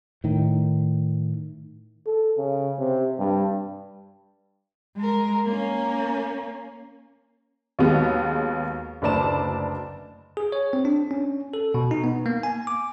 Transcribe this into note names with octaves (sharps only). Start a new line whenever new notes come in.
A2 D#3
A4
C#3
C3
G2
G#3 A#4
A#3 C#4
D#2 D#3 F#3 G#3 B3
F#1 D2 B4 D5 A5 E7
G#4
C#5
C4
D4
C#4
A4
B2
D#4
B3
A#3
G#5
D6